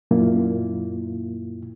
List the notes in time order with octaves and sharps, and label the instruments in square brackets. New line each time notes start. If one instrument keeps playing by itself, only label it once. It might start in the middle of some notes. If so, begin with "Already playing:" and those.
[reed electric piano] F#2 A#2 A#3 E4 F4